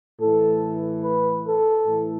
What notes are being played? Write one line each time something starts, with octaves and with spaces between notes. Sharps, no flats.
A2 E3 A4
B4
A4
A2 E3